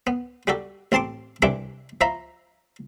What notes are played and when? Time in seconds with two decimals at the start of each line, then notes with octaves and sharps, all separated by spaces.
0.07 B3
0.47 G3 F#4 G4 A4
0.92 A1 C4 A5 C6 D6
1.42 C2 E3 D4 E5 D6
2.01 F3 E5 A#5 B5